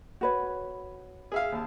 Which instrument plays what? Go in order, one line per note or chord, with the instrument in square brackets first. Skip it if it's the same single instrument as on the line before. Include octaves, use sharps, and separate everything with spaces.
[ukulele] F#4 B4 C#5
[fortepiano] G#4 E5 F5
D#2 A5